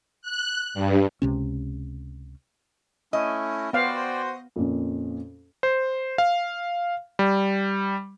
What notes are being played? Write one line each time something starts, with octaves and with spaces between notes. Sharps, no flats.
F#6
G2
C#2 C3 C#4
A3 C#4 E4 D#5
B3 F#4 C5 D5 F5 G5
F2 A#2 C#4
C5
F5
G3